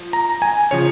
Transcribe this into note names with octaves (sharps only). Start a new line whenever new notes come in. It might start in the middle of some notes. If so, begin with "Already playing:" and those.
Already playing: F3
A#5
G#5
C#3 F3 C#5